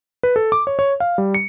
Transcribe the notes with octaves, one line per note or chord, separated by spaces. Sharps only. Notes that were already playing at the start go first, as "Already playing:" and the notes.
B4
A4
D6
C#5
C#5
F5
G3
C#7